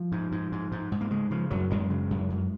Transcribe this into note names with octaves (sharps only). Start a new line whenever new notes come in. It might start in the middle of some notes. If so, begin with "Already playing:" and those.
Already playing: F3
G#2
G#2
G#2
G#2
G#2
A#3
C#3 G#3
C#3 F3
F#2 F#3
F#2 G#3
C#3
F#2
F#2